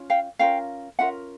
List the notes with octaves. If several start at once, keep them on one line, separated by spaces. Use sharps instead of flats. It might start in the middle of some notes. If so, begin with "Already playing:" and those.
Already playing: C#4 F4
F5 G5
C#4 F4 A#4 F5 G5
C#4 F4 A#4 E5 F#5